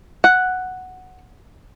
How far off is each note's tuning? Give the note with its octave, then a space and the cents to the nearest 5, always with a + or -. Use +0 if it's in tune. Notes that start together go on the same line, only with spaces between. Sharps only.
F#5 +0